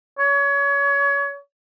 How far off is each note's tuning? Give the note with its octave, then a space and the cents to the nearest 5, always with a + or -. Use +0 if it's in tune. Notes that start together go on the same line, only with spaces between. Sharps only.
C#5 +30